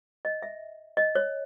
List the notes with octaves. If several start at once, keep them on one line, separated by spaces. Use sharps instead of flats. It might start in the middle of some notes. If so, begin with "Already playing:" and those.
D#5
E5
D#5
C#5